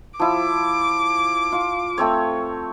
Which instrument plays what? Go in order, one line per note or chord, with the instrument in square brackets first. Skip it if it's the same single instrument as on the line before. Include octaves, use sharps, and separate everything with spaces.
[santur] F3 E4 [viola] D6
[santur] F4
A3 C4 C#5